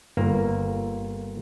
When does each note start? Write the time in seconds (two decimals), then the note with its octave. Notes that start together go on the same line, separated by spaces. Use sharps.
0.17 G1 A#3